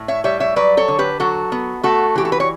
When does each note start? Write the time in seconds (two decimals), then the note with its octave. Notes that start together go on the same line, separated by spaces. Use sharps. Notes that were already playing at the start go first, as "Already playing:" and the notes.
Already playing: A2
0.08 C#5 E5
0.24 G3 C#5 E5
0.40 C#5 E5
0.56 F#3 B4 D5
0.77 A4 C#5
0.88 D3
0.99 G4 B4
1.20 F#3 F#4 A4
1.52 B3
1.83 A3 F#4 A4
2.16 E3 G4
2.25 A4
2.32 B4
2.40 C#5